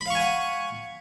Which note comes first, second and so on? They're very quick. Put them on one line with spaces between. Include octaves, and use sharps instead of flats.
B5 F5 C#6 G#5 F#5